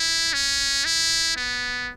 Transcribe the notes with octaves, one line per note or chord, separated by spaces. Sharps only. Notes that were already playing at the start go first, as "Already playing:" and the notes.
Already playing: E4
C#4
E4
B3